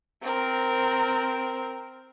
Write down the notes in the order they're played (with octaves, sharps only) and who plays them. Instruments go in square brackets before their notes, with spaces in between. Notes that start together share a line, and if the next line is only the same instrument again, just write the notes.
[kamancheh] C4 A#4